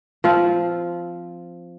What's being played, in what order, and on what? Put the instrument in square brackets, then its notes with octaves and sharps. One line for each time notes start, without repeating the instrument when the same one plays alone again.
[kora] F3 C4 F4